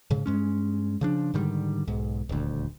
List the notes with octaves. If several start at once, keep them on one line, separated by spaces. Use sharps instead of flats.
G#2 C#3
G2 G#3 C#4
C#3 F3 D4
G#2 D3 D#3 G3
B1 G#2
D#1 D2